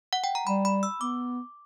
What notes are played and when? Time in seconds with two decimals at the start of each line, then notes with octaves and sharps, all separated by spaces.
0.13 F#5
0.24 G5
0.35 A#5
0.47 G3 B5
0.65 B5
0.83 E6
1.01 B3 D6